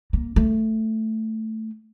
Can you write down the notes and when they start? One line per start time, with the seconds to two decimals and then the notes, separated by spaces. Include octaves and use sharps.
0.13 A#3
0.36 A3